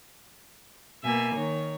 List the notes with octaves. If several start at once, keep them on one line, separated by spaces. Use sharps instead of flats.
B2 A#3 E5 G#5
D#3 C#5